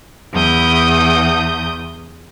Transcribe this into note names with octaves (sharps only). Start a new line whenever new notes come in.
E2 D#6 G6